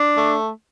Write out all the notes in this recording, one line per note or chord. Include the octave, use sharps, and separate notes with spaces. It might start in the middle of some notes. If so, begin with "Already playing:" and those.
Already playing: D4
A3